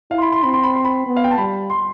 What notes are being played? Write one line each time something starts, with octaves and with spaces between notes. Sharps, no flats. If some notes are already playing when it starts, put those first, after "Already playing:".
E4 F5
C6
B5
C6
C4 B5
C6
B5
C6
B5
B3
F5
G5
A5
G3 B5
C6